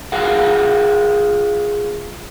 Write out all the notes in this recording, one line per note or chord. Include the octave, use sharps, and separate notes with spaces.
F4 G#4 A#4 F5 F#5